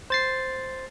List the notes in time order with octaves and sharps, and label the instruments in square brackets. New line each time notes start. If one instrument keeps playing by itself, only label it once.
[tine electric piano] C5 A6 C7